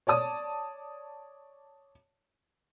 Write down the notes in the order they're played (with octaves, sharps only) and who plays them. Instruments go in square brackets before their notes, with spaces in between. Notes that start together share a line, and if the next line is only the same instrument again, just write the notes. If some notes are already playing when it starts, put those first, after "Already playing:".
[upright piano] C#5 D5 A5 D#6